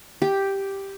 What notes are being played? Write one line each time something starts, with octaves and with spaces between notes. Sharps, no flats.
G4